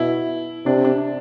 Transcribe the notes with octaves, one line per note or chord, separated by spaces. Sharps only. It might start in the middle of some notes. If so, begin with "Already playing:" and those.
Already playing: B2 E4
C3 D4
D4